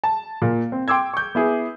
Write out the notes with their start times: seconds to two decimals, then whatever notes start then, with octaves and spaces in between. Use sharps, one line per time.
0.04 A5
0.42 A#2
0.72 C4
0.88 G5 C6 D6 E6 G#6
1.14 C#6 G6
1.35 B3 E4 G#4